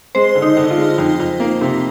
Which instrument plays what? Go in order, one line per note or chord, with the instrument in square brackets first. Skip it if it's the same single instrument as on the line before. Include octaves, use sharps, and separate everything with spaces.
[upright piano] G#3 [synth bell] C5
[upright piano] D3
[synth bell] D#4
[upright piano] D3
[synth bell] F4
[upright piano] G#3
F2
F2
A#3
C3